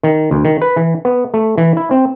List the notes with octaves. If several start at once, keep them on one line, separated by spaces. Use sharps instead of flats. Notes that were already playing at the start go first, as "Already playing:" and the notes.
D#3
D2
D#3
B4
E3
B3
A3
E3
E4
C4